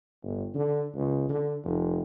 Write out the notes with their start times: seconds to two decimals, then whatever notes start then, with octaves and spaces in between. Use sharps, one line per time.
0.22 G1
0.55 D3
0.94 C#2
1.29 D3
1.64 F1